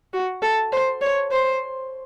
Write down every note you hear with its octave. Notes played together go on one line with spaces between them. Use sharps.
F#4
A4
C5
C#5
C5